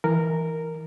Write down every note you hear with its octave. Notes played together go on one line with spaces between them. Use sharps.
E3 A#4